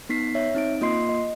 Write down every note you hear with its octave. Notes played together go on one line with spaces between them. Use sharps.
B3 D#4 B6 C7
C#5 E5
C4 D#4 D7
A#3 F4 D#5 C6 C7
D#5